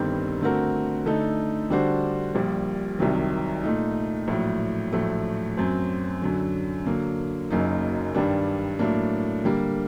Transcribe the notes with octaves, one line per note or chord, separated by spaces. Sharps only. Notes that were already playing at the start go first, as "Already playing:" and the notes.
Already playing: G1 G2 D#3 G3 C4
D3 A3 C4 F#4 A#4
D3 A3 D#4 A4
D3 G3 D4 F#4 C5
A#1 A#2 G3
C2 C3 D#3 F#3
A#2 A3 D#4
A#1 A2 F#3
A#1 A2 F#3 A3
F#2 F#3 C4
F#2 D3 F#3
D3 F#3 A#3
F#1 F#2 F#3 A#3 D#4
G2 D#3 G3 D4
A2 F#3 A#3 D4
D3 G3 A#3